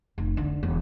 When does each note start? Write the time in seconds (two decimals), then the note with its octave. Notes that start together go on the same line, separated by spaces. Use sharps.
0.18 F1
0.37 D3
0.63 E1 E2